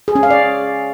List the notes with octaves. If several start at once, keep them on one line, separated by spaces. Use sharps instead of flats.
G#4
C#4
F5
D5